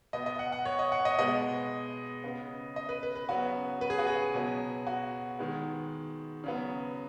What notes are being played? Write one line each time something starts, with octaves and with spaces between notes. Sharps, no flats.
B2 B3 D#5
D#5
F#5
F#5
C#5
D#5
F#5
D#5
B2 G#3 B3 D#5
C#3 B3
D#5
B4
B4
B4
C#3 F#3 B3 F#4
B4
G#4
F#4
G#4
B2 F#3 B3
F#4
D#3 G#3 B3
C#3 F#3 B3